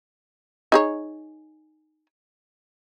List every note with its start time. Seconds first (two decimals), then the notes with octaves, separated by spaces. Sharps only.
0.72 D#4 G#4 C#5